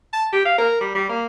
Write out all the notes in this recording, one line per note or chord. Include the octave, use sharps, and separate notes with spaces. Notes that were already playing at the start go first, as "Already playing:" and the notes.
A5
G4
F5
A#4
G3
G3
A#3